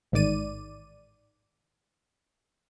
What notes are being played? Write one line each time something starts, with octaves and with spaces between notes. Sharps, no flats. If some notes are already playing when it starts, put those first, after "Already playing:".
A1 G#2 D#3 D5 D#7